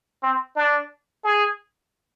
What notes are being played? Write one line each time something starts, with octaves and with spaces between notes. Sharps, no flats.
C4
D4
G#4